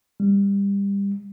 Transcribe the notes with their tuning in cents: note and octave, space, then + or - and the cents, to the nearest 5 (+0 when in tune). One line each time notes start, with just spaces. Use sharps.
G3 +25